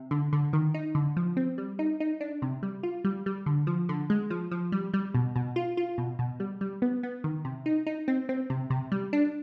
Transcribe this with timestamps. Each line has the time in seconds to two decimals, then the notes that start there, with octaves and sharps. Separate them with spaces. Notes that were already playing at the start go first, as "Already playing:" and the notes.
Already playing: C3
0.11 D3
0.33 D3
0.53 D#3
0.74 D#4
0.95 D3
1.17 F3
1.37 C4
1.58 G3
1.79 D#4
2.00 D#4
2.21 D4
2.42 C3
2.63 G3
2.83 F4
3.05 G3
3.26 G3
3.46 D3
3.67 F3
3.89 D3
4.10 G#3
4.30 F3
4.51 F3
4.72 G3
4.94 G3
5.14 B2
5.36 B2
5.56 F4
5.77 F4
5.98 B2
6.19 B2
6.40 G3
6.61 G3
6.82 B3
7.03 B3
7.24 D#3
7.45 C3
7.66 D#4
7.86 D#4
8.08 C4
8.29 C4
8.50 C3
8.70 C3
8.92 G3
9.13 D4